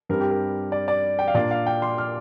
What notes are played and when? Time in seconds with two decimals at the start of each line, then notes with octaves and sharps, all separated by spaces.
0.09 G2 G3 C4 A#4
0.21 G4
0.31 A#4
0.72 D5
0.88 D5
1.19 G5
1.28 F5
1.35 A#2 A#3 D4 D5
1.51 F5
1.67 G5
1.82 C6
1.98 F6